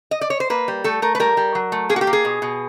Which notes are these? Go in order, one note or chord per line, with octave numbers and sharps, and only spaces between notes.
D#5
D5
C#5
C5
A#3 B4
G3
A3 A4
A3 A#4
B4
G3 A#4
G3
F#3
A3
A#3 G#4
F#4
G4
A#3
G#4
B2
B2